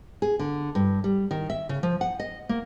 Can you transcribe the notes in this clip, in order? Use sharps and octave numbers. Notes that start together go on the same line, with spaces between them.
G#4
D3
G2
G3
D#3
E5
C#3
F3
F#5
D#5
A#3